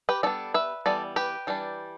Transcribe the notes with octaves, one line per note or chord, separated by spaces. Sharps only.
G4 B4
G3 B3 D4 A4 D5
B4 E5
E3 G3 B3 A4 D5
G4 B4
E3 G3 D4